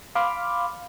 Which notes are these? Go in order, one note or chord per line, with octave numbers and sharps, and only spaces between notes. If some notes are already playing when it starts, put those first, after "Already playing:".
F5 B5 C6 D6 F6